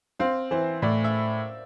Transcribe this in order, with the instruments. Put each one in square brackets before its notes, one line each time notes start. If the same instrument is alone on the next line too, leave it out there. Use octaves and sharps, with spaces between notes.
[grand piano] C4 [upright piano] F5
[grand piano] E3 [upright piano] C5
[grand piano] A2 [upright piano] D5
[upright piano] E5